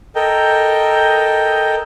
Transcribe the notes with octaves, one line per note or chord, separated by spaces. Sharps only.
A4 A#4 D#5 G5